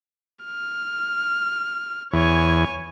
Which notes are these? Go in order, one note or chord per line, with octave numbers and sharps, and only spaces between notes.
F6
E2 C#5 G#5